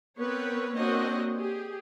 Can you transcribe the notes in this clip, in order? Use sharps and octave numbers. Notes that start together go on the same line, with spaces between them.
B3 C4 A#4 B4 C#5
A#3 C4 D4 F#4 C#5 D#5
G4 G#4